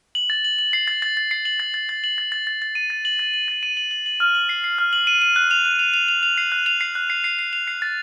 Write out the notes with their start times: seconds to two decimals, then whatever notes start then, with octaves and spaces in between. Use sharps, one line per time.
0.15 F#7
0.30 A6
0.44 F#7
0.59 F#7
0.73 C7
0.88 A6
1.02 A6
1.17 A6
1.31 C7
1.45 F#7
1.60 A6
1.74 A6
1.89 A6
2.04 F#7
2.18 A6
2.32 A6
2.47 A6
2.62 A6
2.75 D#7
2.90 A6
3.05 F#7
3.19 A6
3.34 F#7
3.48 A6
3.63 D#7
3.77 F#7
3.91 F#7
4.06 F#7
4.20 F6
4.35 F#7
4.49 C7
4.64 C7
4.78 F6
4.93 F#7
5.07 D#7
5.22 D#7
5.36 F#6
5.51 F7
5.65 F#6
5.79 F7
5.94 F7
6.08 F7
6.23 F7
6.38 C7
6.52 F#6
6.66 F7
6.81 C7
6.95 F#6
7.10 C7
7.24 C7
7.39 C7
7.53 F7
7.68 C7
7.82 A6